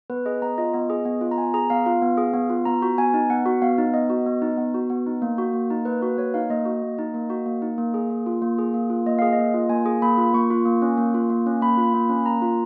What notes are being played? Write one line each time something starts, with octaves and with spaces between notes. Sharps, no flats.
B3 B4
G#4 D#5
B3 A#5
F4 D#5
B3 D#5
G#4
B3
F4
A#5
B3 G#5
G#4 A#5
B3 F5
F4 F5
B3
G#4
B3
F4
B3 A#5
F#4
B3 G#5
D#4
B3 F#5
F#4
B3 F5
D#4
B3 D#5
F#4
B3
D#4
B3
F#4
B3
D#4
A#3
F#4
A#3
D#4
A#3 B4
F#4 B4
A#3 C#5
D#4 F5
A#3 D#5
F#4
A#3
D#4
A#3
F#4
A#3
D#4
A#3
G#4
A#3
F4
A#3
G#4
A#3
F4
A#3 D#5
G#4 F5
D#5
A#3
F4
A#3 G#5
G#4
A#3 B5
F4
A#3 C#6
F4
A#3
C#4
A#3
F4
A#3
C#4
A#3 B5
F4
A#3
C#4
A#3 A#5
F4